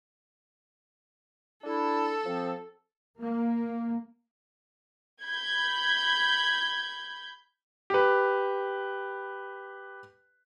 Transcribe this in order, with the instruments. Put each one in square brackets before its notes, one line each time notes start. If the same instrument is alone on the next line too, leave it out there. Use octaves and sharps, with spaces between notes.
[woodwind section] D4 E4 [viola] A4
[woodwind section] F3 C4
[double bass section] A#3
[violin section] B5 G6 G#6
[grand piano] G4 B4